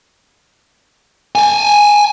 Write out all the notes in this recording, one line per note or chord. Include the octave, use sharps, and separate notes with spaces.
G5 G#5